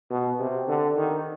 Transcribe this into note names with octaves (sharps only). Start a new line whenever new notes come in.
B2
C3
D3
D#3